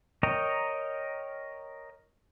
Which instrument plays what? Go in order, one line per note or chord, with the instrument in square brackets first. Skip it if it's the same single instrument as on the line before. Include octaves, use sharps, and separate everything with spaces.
[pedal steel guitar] A#4 C#5 D#5 G5 A#5